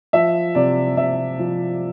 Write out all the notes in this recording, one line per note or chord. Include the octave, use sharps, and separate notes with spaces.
F3 E5
C3 D5
C3 E5
F3